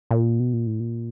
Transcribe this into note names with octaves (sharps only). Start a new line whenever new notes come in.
A#2
B2
A#2
A2
A#2